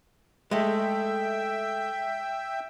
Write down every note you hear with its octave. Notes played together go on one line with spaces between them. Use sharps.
G#3 A3 E5 G5